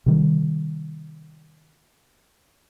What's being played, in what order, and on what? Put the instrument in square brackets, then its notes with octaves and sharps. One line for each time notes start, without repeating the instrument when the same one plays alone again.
[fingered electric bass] C3 D#3 G3